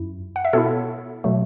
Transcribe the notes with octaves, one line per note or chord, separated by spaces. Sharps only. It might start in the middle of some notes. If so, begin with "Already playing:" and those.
Already playing: F#2 E4
F#5
E5
B2 B3 E4 A4 C#5
B2 F#3 A3